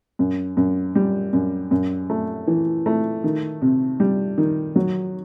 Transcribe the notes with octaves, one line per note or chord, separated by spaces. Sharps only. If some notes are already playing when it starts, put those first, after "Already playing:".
F#2
F#2
G3
F#2
F#2
A3
E3
A3
D#3
C3
G3
D#3
F#3